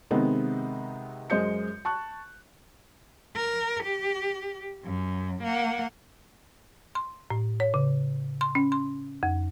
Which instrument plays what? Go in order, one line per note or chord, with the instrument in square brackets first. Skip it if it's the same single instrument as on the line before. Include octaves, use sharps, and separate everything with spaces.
[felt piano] C3 D#3 G#3 B3 C4 D#4
F#2 G#3 C5 D#5 G6 C#7
A5 C#6 F#6
[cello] A#4
G4
F#2
A#3 F#5
[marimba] C6
A2
C#5
C#3
C6
C#4
C6
F2